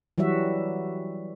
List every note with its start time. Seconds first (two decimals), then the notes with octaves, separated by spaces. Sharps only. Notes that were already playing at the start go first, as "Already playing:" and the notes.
0.18 E3 F#3 G3 F#4 E5